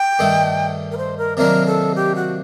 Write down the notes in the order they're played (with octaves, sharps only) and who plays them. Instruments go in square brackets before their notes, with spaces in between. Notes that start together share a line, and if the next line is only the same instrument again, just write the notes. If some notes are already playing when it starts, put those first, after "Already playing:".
Already playing: [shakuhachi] G5
[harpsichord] G2 D#3 A3 D#4 A4
[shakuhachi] A#4
C5
A#4
[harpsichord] C3 D#3 F#3 A#3 D4 [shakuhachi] A#4
[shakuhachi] A4
G4
F#4